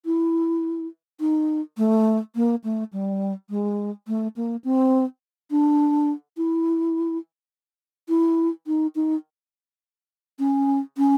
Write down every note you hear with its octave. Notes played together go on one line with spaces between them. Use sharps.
E4
D#4
A3
A#3
A3
G3
G#3
A3
A#3
C4
D4
E4
E4
D#4
D#4
C#4
C#4